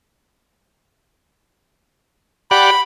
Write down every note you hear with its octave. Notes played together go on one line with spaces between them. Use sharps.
G4 D5 F#5 B5